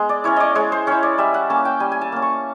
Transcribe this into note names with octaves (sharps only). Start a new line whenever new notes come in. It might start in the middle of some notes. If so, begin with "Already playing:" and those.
Already playing: G#3 B3
D5
C#4 E4 C#5
D5 D#5
G#3 C#5
C5
C#4 E4 C#5
D5
G3 E5
F#5
A#3 C#4 A5
G5
G3 G#5
G#5
A5
A#3 C#4
C#6